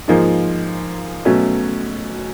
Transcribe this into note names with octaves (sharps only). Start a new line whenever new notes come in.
G#2 F3 A#3 D#4 G#4
B2 F#3 A3 C#4